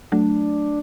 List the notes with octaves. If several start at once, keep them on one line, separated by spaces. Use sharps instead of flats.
F#3 A3 D4